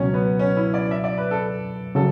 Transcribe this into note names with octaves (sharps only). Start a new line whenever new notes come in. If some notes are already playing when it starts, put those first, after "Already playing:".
Already playing: C#2 B2 F#3 C#4
B3
C#4
E4
D5
E5
D5
B4
A4
C#3 F#3 A4